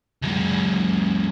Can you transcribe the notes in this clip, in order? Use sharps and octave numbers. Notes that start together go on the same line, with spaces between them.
C#2 F#2